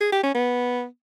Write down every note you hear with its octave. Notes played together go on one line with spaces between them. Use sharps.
G#4
G4
C#4
B3